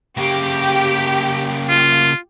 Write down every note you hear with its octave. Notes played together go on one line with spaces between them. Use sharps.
C#3 A#3 G4
F4